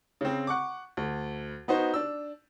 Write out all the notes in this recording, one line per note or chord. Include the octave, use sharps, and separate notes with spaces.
C#3 C4
F#5 C#6 D6
D2
B3 D#4 F#4 C5
D4 E6